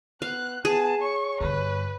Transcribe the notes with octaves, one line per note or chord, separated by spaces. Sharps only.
B3 F5 F#6
B3 G#4 A5
C#5 C#6
G2 D3 B4